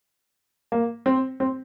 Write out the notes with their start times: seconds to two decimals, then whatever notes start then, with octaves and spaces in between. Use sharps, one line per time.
0.72 A#3
1.06 C4
1.40 C4